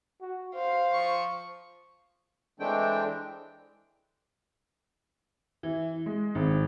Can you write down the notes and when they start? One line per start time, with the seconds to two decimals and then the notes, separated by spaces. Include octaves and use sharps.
0.21 F#4
0.55 C5 F5
0.93 F3 C#6
2.60 E3 G#3 A3 C4 D4 G5
5.63 E3
6.06 G#3
6.35 G#1